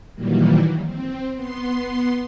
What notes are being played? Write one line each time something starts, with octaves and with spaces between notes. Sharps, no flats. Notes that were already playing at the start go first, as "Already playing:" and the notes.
A#2 D#3 E3 F#3 G3 A#3
C4
B3 C6